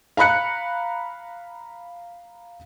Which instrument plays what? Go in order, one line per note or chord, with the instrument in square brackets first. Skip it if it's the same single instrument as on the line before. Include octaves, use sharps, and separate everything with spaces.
[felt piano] F5 A#5 B5 F#6 C#7